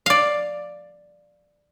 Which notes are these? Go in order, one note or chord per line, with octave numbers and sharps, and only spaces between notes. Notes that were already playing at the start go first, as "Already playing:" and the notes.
D5 F5